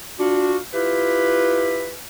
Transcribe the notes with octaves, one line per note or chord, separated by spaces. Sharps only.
D4 F4 F#4
E4 F4 G4 B4